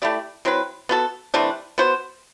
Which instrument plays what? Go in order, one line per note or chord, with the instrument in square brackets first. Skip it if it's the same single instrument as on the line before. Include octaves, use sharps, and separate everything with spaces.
[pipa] A3 E4 G4 D5
F#3 C4 E4 B4
B3 F#4 A4
C3 E3 A3 D4
B3 F#4 C5